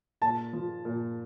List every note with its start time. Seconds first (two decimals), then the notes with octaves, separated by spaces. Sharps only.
0.21 A#2 A5
0.53 F3
0.85 A#2